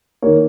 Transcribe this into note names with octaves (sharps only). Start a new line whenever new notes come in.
D#3 A#3 C#5